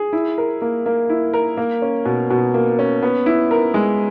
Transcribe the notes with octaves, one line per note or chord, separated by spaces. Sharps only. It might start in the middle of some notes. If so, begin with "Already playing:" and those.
Already playing: G#4
E4
A#4
A#3
A#3
E4
A#4
A#3
C#4
B2
B2
A#3
C#4
B3
E4
A#4
G#3